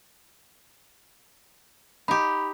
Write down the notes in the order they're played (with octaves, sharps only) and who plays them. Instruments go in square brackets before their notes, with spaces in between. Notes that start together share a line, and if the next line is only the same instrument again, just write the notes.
[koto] D#4 G4 [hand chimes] B5